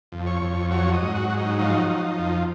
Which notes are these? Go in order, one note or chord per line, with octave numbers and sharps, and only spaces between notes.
F2
C#5
F2
F#3 C#5
D#5
G#2
F#4
F#3
D#4
F3 D#4
F3
F2